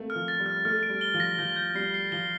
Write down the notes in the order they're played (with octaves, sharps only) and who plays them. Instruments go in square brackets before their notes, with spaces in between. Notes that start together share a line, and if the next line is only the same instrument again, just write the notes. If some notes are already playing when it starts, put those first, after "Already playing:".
Already playing: [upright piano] A3 A#3 C4
[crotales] F6
[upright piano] F3
[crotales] A6
[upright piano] G3
[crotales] F6
[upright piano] A3 [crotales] F6
[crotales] D7
[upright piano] G3
[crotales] G7
[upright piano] F3
[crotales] A#6
[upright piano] F3 [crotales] G6
[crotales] G6
[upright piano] G3 [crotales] C7
[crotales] C7
[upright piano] F3 [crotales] G7